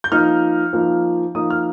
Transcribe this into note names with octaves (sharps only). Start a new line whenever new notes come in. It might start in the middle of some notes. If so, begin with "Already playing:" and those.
G6
F3 A#3 D#4 F6
F3 A#3 D#4
F3 A#3 D#4 D#6
F6